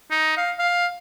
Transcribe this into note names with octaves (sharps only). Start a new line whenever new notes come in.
D#4
F5
F5